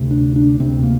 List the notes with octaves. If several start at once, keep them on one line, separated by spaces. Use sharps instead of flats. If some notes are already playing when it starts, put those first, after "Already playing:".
Already playing: D2 C3
D4
D4
D2 C3 C4
A#3